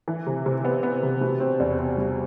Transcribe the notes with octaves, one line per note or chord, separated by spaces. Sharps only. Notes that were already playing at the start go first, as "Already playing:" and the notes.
E3
C3
C3
B3
B3
C3
B2
C4
E2
C4
G3